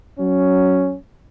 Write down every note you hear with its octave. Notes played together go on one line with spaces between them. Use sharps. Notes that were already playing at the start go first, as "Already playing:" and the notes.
F#3 C#4